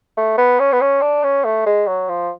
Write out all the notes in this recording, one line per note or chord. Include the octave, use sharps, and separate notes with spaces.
A3
B3
C#4
B3
C#4
D4
C#4
A3
G#3
F#3
F3